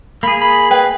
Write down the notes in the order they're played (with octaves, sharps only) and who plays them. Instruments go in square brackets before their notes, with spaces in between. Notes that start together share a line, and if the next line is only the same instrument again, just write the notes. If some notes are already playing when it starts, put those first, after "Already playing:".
[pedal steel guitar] A#3 G#4 [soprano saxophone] B5
[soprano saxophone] B5
[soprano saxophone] B4 [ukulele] F5 G5 G#5